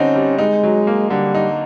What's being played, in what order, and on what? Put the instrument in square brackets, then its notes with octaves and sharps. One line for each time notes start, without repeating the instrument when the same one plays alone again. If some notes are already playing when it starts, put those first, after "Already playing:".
Already playing: [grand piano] D3 G3 C4 D#4 [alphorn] C#4
[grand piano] G3
[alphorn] G#3 [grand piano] D#4
[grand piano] F#3
A#3
[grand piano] D3 [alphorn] G3
[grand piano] D#4